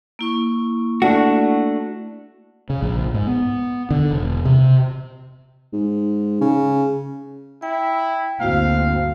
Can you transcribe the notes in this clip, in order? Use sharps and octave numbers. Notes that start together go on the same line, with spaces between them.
A#3 E4 C#6
A3 D4 F#4
C#3
A#1
G#2
B3
D3
E1
C3
G#2
C#3
E4 G5
G1 D2 A#3 C4 E4 F#4 F5